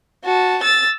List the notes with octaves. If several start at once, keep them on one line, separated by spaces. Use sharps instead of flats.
F#4 A5
E6 A6